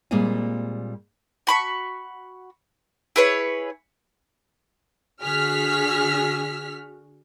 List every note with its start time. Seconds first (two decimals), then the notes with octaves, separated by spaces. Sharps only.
0.11 A#2 G3 G#3 A#3 C4 G#5
1.47 F#4 B5 C#6
3.16 E4 G#4 B4 C#5
5.22 D3 F#4 G#4 F6 B6